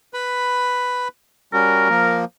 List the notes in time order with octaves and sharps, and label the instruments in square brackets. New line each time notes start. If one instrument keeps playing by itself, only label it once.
[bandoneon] B4 B5
[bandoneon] G3 C#4 F#4 [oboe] A#4
[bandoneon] F3 A#3